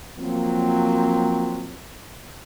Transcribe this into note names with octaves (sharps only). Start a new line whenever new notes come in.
F3 F#3 A#3 C4